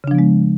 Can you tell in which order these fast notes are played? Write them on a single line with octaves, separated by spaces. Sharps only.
C#3 D4 F3 B3 G#3